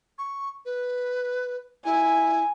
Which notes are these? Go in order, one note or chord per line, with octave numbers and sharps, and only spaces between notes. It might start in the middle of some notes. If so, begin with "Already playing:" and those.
C#6
B4
E4 G#5